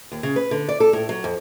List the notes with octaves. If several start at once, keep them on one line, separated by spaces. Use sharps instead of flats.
D#2
C#3
B4
D3
D5
A4
A2
F#3
F2